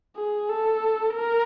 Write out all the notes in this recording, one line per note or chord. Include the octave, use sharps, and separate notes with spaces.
G#4
A4
A#4